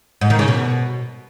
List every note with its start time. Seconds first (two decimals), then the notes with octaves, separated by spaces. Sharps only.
0.21 G#2
0.30 D#3
0.39 C#3
0.48 B2